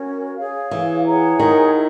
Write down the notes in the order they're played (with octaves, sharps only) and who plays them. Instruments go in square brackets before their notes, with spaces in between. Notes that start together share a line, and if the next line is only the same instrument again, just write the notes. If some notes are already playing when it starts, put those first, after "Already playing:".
Already playing: [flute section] C#4 F#4 A#4 C#5
G#4 C#5 F5
[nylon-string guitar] E3
[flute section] G#4 C#5 F#5 A#5
[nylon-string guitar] D#3
[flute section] E4